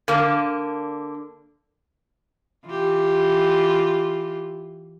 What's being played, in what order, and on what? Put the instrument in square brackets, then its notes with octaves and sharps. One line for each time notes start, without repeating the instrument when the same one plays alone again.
[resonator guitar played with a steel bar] D3 A#3
[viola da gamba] E3 F4 G4